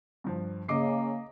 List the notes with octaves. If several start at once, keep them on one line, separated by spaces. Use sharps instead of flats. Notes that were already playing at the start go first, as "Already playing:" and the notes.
G2 F3
C#3 A#3 D#5 D6 C7